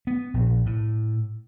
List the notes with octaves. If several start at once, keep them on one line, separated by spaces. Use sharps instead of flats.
B3
A#1
A2